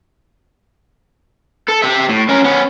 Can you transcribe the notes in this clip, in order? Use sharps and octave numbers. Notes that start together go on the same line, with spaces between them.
A4
G4 E5
A2
C#4 A#4
B3 C#4